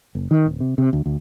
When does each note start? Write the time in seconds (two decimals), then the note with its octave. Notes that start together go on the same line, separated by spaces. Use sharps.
0.15 F#1
0.31 D#3
0.46 D1
0.60 C3
0.78 C3
0.93 D2
1.06 D2